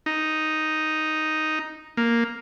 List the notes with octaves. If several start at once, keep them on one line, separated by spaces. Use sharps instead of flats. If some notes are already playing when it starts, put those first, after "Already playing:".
D#4
A#3